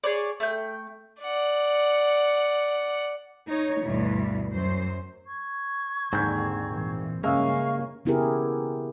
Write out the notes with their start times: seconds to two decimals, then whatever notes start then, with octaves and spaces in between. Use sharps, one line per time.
0.04 G#4 C#5 D5
0.40 A3 G5
1.21 D5 F#5
3.47 D#4 C#5
3.84 D2 G2 B2 E3
4.52 F#2 C5
5.27 C#6 G#6
6.13 D#2 G#2 D3 C4 G6
6.68 A#2 E3
7.24 G2 C#3 G#3 A#3 C#4 E5 F5 C#6
8.05 C#3 B3 E4 G4 G#4 A#4